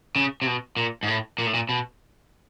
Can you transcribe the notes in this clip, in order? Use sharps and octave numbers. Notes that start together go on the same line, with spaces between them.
C#3
C3
B2
A#2
G#2
A2
A#2
A2
A#2
B2